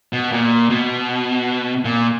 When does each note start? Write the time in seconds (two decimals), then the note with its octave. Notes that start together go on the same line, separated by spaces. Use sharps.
0.13 B2
0.32 A#2
0.70 B2
1.85 A#2